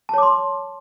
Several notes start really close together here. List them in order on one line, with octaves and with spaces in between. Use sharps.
A5 C#5 D6 C6